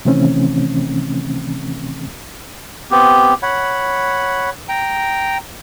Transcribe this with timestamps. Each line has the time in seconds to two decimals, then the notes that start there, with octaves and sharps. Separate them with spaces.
0.05 C3 D#3 E3 A3 C4 C#4
2.91 B3 C4 G4
3.43 C#5 F#5 B5
4.69 G5 A#5